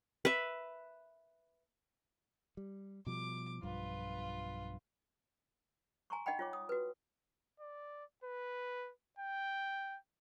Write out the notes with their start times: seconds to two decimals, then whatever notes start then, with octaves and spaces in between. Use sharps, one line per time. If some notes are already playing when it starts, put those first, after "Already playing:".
0.25 B4 E5
2.57 G3
3.06 B2 F3 G3 D6
3.62 B1 G2 F3 F4 B4
6.10 G#5 A#5 C6 C#6
6.26 D#4 D#5 F#5 G5 B5
6.39 F4 C#5 D6
6.53 D#6
6.69 F#4 B4
7.60 D5
8.24 B4
9.19 G5